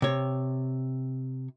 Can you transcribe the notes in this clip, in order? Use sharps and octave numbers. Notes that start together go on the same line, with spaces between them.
C3 C#5